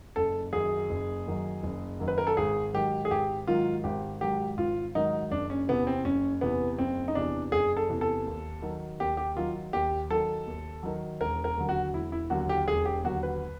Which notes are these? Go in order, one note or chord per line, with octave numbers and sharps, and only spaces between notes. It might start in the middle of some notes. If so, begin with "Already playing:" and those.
F#1 A4
F#2 D#3 F#3 G#4
F#1
F#2 D#3 F#3
F#1
F#2 D#3 F#3
B4
A#4
A4
G#1 G#4
G#2 D#3 F#3 G4
G#4
G#1 G4
G#2 D#3 F#3 F4
G#1 G4
G#2 D#3 F#3 G4
G#1 F4
G#2 D#3 F#3 D#4
F#1 D4
C#4
E2 C3 E3 B3
C4
F#1 C#4
E2 C3 E3 B3
F#1 C4
D#4
E2 C3 E3 D4
F#1 G#4
A4
E2 C3 E3
A4
D#2
D#3 F#3
D#2 G4
G4
D#3 F#3 F4
D#2 G4
D#3 F#3 A4
D#2
D#3 F#3
E1 A#4
A#4
D#2 D3 F#3
F#4
E1 E4
E4
D#2 D3 F#3 F#4
G4
E1 G#4
G4
D#2 D3 F#3 F#4
B4